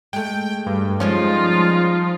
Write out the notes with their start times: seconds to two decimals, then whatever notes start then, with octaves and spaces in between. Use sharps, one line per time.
0.13 G#3 A3 G5
0.67 G2
1.00 F3 G3 G#3 C#4 D#4 F4